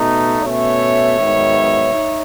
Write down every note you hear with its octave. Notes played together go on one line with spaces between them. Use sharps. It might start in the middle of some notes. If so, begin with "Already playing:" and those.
Already playing: B2 A3 D#4
B2 A3 C#4 C#5 E5
G#2 D#3 F#3 B3
D#4